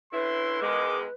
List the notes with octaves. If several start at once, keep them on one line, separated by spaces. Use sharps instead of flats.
D3 C#4 E4 B4 C6
E2 D#3 G#3 D6